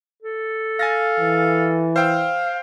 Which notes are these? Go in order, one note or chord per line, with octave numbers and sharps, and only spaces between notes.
A4
F5 G#5 A6 A#6
E3
C5 F5 G5 E6